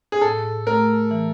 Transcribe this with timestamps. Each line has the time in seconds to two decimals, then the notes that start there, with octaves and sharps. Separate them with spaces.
0.12 G#4
0.21 A2 A4
0.66 A3 A#4
1.11 E3